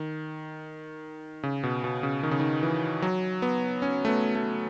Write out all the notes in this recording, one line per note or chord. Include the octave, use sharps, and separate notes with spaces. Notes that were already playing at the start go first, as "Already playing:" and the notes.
Already playing: D#3
C#3
B2
B2
C#3
D#3
C#3
D#3
E3
F#3
B3
C#4
A3
B3
A3